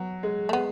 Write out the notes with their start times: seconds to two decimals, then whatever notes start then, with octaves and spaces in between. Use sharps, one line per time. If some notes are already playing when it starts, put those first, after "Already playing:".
Already playing: F#3 B3
0.23 G#3
0.49 A3
0.53 G#3 B3